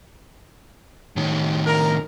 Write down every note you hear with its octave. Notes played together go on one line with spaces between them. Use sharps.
A2 D#3
A#4